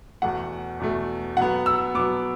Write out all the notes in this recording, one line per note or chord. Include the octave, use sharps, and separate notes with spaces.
E2 B2 A3 F#5
E2 B2 A3
B2 F#3 B3 F#5
E6
B2 F#3 B3 D6